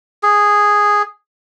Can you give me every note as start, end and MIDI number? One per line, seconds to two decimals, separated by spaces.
0.23 1.02 68